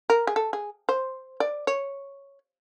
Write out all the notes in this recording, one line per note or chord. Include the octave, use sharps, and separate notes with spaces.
A#4
G#4
A4
G#4
C5
D5
C#5